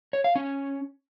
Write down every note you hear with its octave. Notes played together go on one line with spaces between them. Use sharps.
C#5
F5
C#4